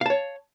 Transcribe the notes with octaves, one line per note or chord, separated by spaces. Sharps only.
C#5 F5 A5